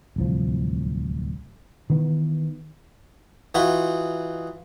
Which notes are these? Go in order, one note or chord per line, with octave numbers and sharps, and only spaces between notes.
D1 C2 F3
D#3 E3 B3
E3 D#4 F4 F#4